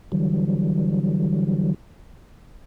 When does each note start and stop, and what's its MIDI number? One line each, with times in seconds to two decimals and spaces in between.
0.12 1.74 50
0.12 1.74 52
0.12 1.74 54
0.12 1.74 55